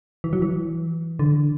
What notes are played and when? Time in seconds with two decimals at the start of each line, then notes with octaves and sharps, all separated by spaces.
0.24 E3
0.33 F#3
0.42 E3
1.19 D3